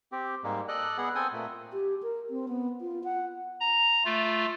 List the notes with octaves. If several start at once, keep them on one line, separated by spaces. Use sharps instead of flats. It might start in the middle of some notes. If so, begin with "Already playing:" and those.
C4 G4
G#2 G3 G#3 A#3
A4 D5 D#5 F#6
B3 G#4 F#5
C4 A4 G5 G#5 D#6
A#2 A3
G4
A#4
C4
B3
F4
F#5
A#5
A3 F4